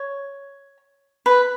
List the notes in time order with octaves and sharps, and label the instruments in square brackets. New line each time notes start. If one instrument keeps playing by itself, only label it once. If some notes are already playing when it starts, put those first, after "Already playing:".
Already playing: [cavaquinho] C#5
B4